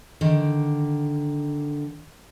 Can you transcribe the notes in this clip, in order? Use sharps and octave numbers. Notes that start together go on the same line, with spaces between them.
D3 D#3